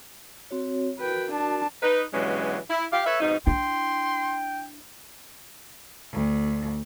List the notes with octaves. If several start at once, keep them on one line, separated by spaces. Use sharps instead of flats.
C4 F#4 C#5
F#4 A#4 B4 G5
D4 A5
D#4 B4
G2 B2 E3 F#3 G#3 C#4
E4
G4 F5
A4 B4 C#5 E5
F2 G#2 B2 D#4
D4 E4 G5 C6
D2